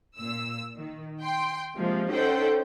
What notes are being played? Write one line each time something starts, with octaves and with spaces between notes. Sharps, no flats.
A#2 E6
D#3
G5 C6
C3 F3 G#3 A#3
C#4 D#4 A4 C5 F#5 G5